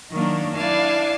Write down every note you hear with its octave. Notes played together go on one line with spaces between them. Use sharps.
D#3 F#3 A#3 D4
D4 E4 D5 F5 G#5 A5